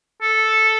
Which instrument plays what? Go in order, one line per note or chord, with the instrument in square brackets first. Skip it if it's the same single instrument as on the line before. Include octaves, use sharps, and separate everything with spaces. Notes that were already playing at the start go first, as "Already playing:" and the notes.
[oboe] A4